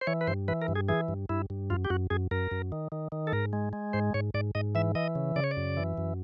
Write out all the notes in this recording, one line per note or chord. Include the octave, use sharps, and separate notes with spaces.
C5
E3 C#5
B4
G2 C5
E3 B4
A#4
G2
G#4
E3 G#4
G2
G2 E4
G2
F#2 F4
G4
F#2 F#4
F#2 G#4
F#2 A#4
F#2
D#3
D#3
D#3
A4
G#2 A#4
G#3
G#3
G#2 C5
G#2 C#5
G#2 D5
G#2 D#5
E3 E5
E3 D#5
C#3
C#3 D5
C#5
D5
F#2
E3
F#2